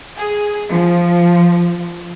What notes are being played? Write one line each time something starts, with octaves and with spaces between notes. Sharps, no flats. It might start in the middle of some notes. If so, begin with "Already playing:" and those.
G#4
F3